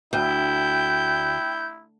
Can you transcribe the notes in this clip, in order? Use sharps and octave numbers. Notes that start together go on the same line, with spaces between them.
D2 E4 G5 G6